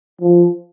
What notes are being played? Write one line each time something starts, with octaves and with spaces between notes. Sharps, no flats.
F3